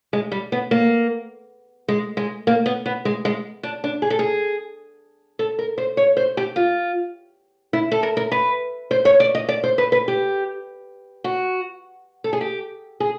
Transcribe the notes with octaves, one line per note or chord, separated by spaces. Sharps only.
G#3
G3
B3
A#3
G#3
G#3
A#3
B3
B3
G#3
G#3
D4
D4
G#4
A4
G#4
A4
A#4
C5
C#5
C5
G4
F4
E4
A4
A#4
A#4
B4
C5
C#5
D5
D#5
D5
C5
B4
B4
G4
F#4
A4
G#4
G4
G#4